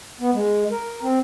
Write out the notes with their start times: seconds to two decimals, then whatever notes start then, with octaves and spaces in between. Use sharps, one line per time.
0.20 B3
0.33 G#3
0.71 A#4
1.02 C4